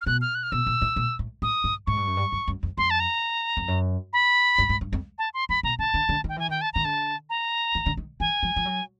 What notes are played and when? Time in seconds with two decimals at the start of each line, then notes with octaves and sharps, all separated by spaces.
0.01 F6
0.06 B2 F#6
0.21 F6
0.35 F#6
0.43 F6
0.52 B2 E6
0.66 A#2
0.82 A2
0.96 A#2
1.19 A2
1.42 A2 D#6
1.64 G#2
1.87 G#2 C#6
1.97 G2
2.07 F#2
2.17 G2
2.32 F#2
2.48 F#2
2.63 F2
2.77 F2 C6
2.90 A5
3.00 A#5
3.57 F2
3.68 F#2
4.13 B5
4.58 G2
4.69 G#2
4.81 G2
4.93 F2
5.18 A5
5.34 C6
5.49 F2 B5
5.63 B2 A#5
5.79 D3 A5
5.94 D3
6.09 D3
6.24 D#3 G5
6.36 E3 G#5
6.49 D#3 G5
6.61 A5
6.73 D#3 A#5
6.85 D3 A5
7.30 A#5
7.75 D#3
7.86 D3
7.97 D#3
8.20 E3 G#5
8.43 F3
8.56 F3
8.65 F#3